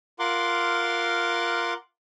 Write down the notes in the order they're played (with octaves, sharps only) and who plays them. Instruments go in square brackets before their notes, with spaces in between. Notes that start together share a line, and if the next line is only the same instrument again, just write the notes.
[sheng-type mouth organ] F4 A#4 F#5 C6 D6